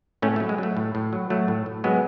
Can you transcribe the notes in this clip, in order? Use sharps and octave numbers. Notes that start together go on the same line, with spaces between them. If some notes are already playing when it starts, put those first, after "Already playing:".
A2 A3 C#4
A3
F#3
G#3
F#3 A3
A2
A2
F#3
F#3 A3
A2
A2
F#3 G#3 B3